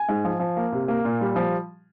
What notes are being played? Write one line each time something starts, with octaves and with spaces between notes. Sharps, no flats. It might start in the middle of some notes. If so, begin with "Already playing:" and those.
Already playing: G#5
G#2
F3
F3
A#3
C3
A#3
A#2
G3
F3